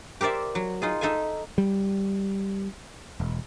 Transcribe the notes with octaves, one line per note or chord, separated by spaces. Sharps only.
G4 A#4 C5 D5 E5
F#3
D#4 F4 G#4
D#4 A4 E5 F5 G#5
G3
E1